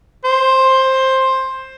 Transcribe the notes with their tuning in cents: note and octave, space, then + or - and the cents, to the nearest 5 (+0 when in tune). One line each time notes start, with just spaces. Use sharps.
C5 +10